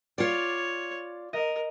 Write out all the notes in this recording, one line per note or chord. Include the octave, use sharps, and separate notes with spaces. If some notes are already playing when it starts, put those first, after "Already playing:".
F4 C#5 D5
A#4 D#5